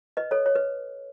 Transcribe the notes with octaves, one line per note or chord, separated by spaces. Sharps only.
B4 D#5
A4 C#5
C#5
B4